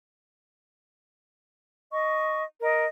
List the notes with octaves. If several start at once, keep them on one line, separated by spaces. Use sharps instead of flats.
D#5 C#6
A#4 D#5